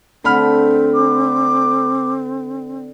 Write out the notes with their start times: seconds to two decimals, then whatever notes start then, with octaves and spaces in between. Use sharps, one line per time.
0.24 D3 A3 C4 B5 F6
0.94 D6